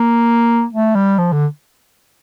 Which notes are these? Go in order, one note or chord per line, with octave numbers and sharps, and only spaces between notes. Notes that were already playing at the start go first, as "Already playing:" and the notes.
Already playing: A#3
A3
G3
F3
D3